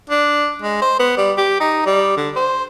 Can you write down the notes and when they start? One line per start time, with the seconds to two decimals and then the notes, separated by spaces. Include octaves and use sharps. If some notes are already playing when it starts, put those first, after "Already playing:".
0.10 D4
0.62 G#3
0.82 C5
0.99 B3
1.18 G3
1.38 G4
1.60 D#4
1.86 G3
2.17 D3
2.36 C5